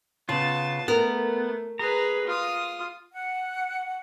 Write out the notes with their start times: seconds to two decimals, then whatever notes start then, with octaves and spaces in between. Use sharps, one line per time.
0.29 C#3 B3 F4 A5
0.88 A3 B3 A#4
1.79 G#4 B4 A#5
2.27 F4 D#6
3.13 F#5